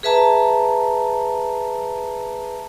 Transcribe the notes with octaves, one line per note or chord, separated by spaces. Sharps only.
G#4 B4 E5 A5 A#5